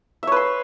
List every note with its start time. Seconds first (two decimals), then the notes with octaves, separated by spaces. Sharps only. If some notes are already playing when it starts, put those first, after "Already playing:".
0.23 E5
0.27 C#5
0.32 B4
0.36 C6